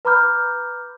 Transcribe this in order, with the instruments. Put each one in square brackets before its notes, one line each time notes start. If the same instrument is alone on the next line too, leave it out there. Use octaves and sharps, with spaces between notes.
[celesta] B4 A#5 B5 D6 F6 G6